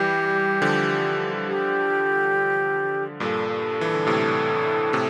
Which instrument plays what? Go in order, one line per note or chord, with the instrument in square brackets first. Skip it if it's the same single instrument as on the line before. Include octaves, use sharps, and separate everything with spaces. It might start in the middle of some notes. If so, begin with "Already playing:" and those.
Already playing: [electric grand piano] E3 G3 [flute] G4
[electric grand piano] D3 F3
[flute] G4
[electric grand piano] G2 A#2 [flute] A4
[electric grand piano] E3
D3
A2 C3
A2 C3